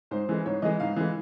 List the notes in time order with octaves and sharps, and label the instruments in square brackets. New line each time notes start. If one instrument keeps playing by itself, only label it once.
[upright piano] G#2 C5
E3 G#3
G#2 C#5
E3 G#3 D#5
G#2 F5
E3 G#3